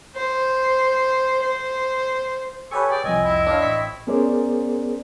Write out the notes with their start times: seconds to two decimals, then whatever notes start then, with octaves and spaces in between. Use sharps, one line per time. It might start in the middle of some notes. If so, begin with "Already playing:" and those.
0.16 C5
1.42 C5
2.71 G4 A4 B4 C#5 G#5 C#6
2.90 G#4 D5 G5
3.04 C2 F2 C4 D#5 G#5
3.24 E4
3.47 D4 C#5 F5
3.62 A1 C#6 B6
4.07 B3 C#4 G#4 A#4 C5 D5